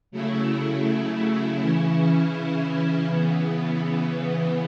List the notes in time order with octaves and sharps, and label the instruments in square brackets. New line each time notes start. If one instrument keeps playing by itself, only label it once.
[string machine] C#3 F#3 A3 E4
C#3 E3 C#4 E4
C#3 E3 B3